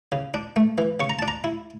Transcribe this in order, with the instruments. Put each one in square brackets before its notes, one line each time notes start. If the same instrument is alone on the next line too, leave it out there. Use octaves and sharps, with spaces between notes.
[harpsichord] C#3
D4
A3
E3
C#3 C#6
A#5
D4 A5
A#5
E4